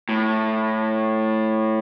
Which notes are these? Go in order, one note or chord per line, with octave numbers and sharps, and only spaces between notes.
A2